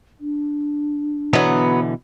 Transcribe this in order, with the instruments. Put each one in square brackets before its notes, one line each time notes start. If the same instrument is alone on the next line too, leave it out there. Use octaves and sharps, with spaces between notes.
[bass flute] D4
[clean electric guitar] B2 D3 E3 [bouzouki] F#3 B3